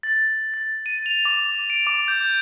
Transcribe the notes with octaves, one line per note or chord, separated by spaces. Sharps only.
A6
A6
D#7
F7
D6
D7
D6
G6